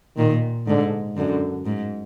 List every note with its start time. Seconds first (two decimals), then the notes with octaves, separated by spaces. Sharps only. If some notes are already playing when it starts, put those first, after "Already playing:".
0.17 A#2 D#3
0.67 G#2 D3
1.16 F#2 D3
1.65 G#2